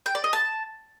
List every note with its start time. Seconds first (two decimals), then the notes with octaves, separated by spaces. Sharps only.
0.06 G5
0.15 D5
0.24 D#5
0.33 A5